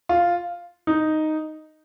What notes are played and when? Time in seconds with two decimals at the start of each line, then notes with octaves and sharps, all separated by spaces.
0.09 F4
0.87 D#4